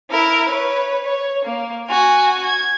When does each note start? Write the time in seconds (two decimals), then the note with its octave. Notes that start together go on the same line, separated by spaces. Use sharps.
0.10 E4 A#4
0.49 B4 C#5
1.03 C#5
1.45 A#3
1.88 F#4 G#5
2.45 G#6